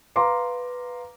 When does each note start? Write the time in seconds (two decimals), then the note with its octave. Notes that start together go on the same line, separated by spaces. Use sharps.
0.16 B4 F5 A#5 C6 D6